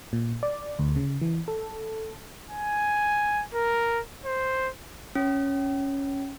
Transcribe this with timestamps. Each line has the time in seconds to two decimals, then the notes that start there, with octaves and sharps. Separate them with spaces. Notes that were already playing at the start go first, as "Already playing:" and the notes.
0.13 A#2
0.43 D5
0.79 D2
0.96 C#3
1.22 E3
1.48 A4
2.50 G#5
3.54 A#4
4.26 C5
5.15 C#4